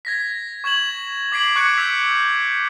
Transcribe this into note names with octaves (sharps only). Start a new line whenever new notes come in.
G#6 A#6 B6
C#6 G#6 E7 F#7
D6 G#6 B6 C7 D7 F#7
C#6 D6 F#6 G#6 C#7 D7
E6 G6 B6 F7